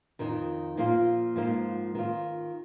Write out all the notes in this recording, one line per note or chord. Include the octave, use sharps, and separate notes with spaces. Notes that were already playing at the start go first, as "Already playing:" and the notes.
F2 D#3 C4 D#4
A#2 F3 A#3 F4
G#2 F3 A#3 D#4
D#3 C4 F4